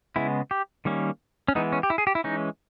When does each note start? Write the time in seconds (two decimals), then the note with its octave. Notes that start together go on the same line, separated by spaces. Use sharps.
0.16 C#3 G#3 B3 E4
0.51 G4
0.85 D#3 G3 A#3 C#4
1.48 C#4
1.55 E3 G#3 B3 D#4
1.72 C#4
1.83 G4
1.90 E4
1.98 G#4
2.07 G4
2.15 E4
2.24 E3 G#3 C#4 D#4